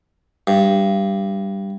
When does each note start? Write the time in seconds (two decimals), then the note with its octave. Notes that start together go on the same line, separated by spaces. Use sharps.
0.47 G2